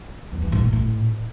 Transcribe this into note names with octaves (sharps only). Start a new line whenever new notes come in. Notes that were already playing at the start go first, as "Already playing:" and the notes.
E2
E3
G#2
A#2
A2